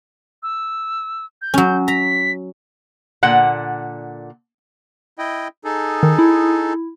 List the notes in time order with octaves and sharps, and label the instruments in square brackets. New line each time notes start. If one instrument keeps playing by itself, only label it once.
[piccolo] E6
G6
[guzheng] F#3 C#4
[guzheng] A#5 [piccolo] B6
[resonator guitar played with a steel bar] A#2 D3 F#5
[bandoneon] E4 D#5 G5
D#4 G#4 A4
[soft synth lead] D#3
E4